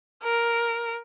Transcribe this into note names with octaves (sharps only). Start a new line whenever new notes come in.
A#4